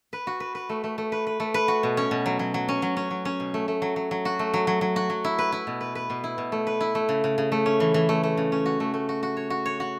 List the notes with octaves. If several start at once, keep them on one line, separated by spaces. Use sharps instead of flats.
B4
F#4
B4
B4
A3
A3
A3
B4
B4
A3
B4
F#4
B2
C#4
B2
F#3
F#3
F#3
C#4
F#3
C#4
F#3
C#4
B2
A3
A3
F#3
F#3
F#3
F#4
A3
F#3
F#3
F#3
F#4
F#3
E4
B4
E4
B2
B4
B4
B2
E4
B2
A3
B4
E4
A3
C#3
C#3
C#3
A3
C#4
E3
E3
A3
A3
C#3
C#4
F#4
A3
A3
F#4
F#4
C#5
F#4
C#5
F#4